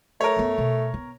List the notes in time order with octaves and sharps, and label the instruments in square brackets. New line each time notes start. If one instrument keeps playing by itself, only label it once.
[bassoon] A3 [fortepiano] A#4 C#5
[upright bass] F#2 B3
B2
B3 C4